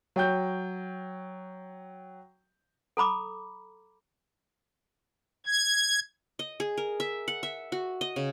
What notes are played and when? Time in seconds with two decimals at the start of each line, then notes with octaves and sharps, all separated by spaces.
0.16 F#3 G5 G6
2.97 A4 A#5 B5 D6
5.46 G#6
6.39 D#5
6.60 G#4
6.77 A#4
7.00 E5
7.28 F#5
7.43 E5
7.72 F#4
8.01 D#5
8.16 C#3